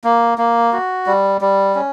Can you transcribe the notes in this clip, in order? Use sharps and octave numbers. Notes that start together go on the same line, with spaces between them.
A#3
A#3
F#4
G3
G3
C#4